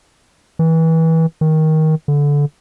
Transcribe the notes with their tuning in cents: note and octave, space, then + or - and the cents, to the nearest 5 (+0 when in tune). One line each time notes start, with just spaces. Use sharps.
E3 -25
D#3 +15
D3 -20